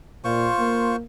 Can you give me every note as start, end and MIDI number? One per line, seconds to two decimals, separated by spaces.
0.24 0.48 46
0.24 0.96 65
0.24 0.96 72
0.24 0.96 85
0.59 1.04 58